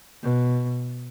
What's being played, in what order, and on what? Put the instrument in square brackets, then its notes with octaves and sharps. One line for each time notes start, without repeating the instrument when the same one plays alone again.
[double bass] B2